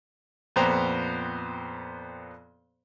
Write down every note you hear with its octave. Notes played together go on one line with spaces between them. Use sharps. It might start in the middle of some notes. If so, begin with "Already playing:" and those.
F2 A#2 B3 C5 G5 A#5